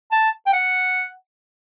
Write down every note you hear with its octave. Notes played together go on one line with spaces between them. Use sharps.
A5
G5
F#5